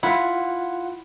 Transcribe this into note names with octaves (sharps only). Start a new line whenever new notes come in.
E4 F4 F#5